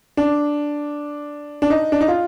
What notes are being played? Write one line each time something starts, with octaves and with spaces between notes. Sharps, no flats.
D4
D4
D#4
D4
D#4
F4